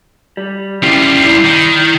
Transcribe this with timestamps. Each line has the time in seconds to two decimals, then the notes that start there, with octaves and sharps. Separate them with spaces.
0.37 G3
0.82 C#3 G3 E4 F4 G4
1.23 E4 D5
1.44 D#3